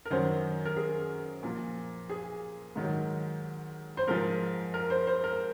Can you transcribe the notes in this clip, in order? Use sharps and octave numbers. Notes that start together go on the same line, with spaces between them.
A#4
F#2 D#3 F#3 C5
A#4
G#4
A#2 F3
G#4
G#2 D#3 F#3
C5
G#2 F3 A#4
A#4
C5
C5
A#4